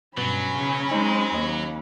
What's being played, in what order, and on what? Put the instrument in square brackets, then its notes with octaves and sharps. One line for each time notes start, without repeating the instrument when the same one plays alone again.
[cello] G2 [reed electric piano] B2 B4 A6 [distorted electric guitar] F#3 [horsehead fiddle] C#4 B5
[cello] C#3
[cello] G#3 C4 [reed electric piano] D#4 C5
[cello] D#2 [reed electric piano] D#5